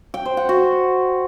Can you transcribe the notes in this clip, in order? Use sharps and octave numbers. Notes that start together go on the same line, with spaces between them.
G5
C5
F#5
F#4